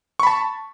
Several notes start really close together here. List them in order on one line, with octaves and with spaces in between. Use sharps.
C#6 B5 A5